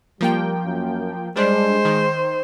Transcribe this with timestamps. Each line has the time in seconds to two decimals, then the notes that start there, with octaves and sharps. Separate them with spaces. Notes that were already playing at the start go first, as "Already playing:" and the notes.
0.21 F3 G3 A#3 G5
0.65 F#2
1.37 G3 G#3 D4 C5
1.85 D#3